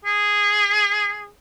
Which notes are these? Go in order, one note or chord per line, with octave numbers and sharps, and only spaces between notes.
G#4